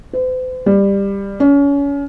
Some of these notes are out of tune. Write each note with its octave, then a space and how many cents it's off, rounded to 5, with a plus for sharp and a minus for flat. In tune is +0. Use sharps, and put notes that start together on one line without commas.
C5 -45
G3 +15
C#4 +30